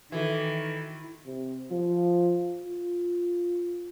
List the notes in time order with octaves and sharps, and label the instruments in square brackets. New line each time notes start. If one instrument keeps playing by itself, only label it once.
[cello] D#3 [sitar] E3 [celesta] F#4 A4 E5
[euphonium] C3
F3
F4